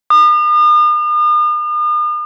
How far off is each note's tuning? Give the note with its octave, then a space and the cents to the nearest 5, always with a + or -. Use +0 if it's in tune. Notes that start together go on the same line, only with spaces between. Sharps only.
D#6 -45